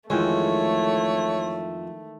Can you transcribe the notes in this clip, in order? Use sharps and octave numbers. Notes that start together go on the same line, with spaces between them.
F2 D#3 E3 G#3 A3 C#5